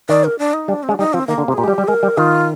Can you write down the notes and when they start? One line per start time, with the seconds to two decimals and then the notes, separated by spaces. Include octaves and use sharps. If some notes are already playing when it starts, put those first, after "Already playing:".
0.09 D#3 D5
0.24 A#4
0.39 D4
0.54 D#4
0.68 G3 D4
0.83 C4
0.89 G#3
0.91 D4
0.99 G3 D#4
1.13 F3 C4
1.28 D#3 A#3
1.38 D3
1.48 C3
1.53 G#4
1.58 A#2 G4
1.64 G#3
1.68 G3
1.78 G3
1.88 G#3 A#4
2.03 G3
2.17 D#3 F4